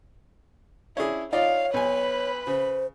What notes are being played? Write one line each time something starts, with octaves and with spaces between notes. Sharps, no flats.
C#4 D4 E4 G#4
D#4 F4 C#5 D5 F5
B1 B4 G#5 B5
C#3 C5